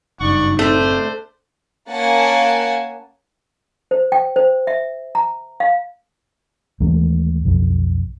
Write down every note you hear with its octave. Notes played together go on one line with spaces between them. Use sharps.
F#1 G2 D#4 D5 F#5 C#6
F#1 A2 A3 C4 D4 C5
A#3 C#4 F#5 G#5 A5
C5
G5
C5
E5
A#5
F5
D#2 E3 G#3 A3
B1 F2